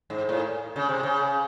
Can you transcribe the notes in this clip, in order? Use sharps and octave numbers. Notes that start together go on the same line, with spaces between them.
G#2
A2
C#3
C3
C#3